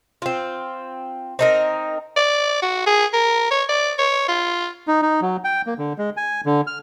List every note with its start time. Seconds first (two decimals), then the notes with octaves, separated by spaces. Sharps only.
0.22 C4 F4
1.39 C4 D#4 A#4
2.16 D5
2.62 F#4
2.86 G#4
3.13 A#4
3.51 C#5
3.69 D5
3.98 C#5
4.28 F4
4.88 D#4
5.02 D#4
5.22 F#3
5.44 G5
5.66 A#3
5.78 D3
5.98 G#3
6.17 G#5
6.46 D3
6.67 F6